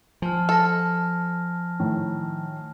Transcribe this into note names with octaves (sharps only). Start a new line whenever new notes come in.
F3 G#5 A5 F6
A4 F6 A#6
A2 D#3